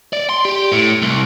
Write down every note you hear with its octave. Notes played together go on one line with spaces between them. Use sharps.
D5
C6
G4
A2
C2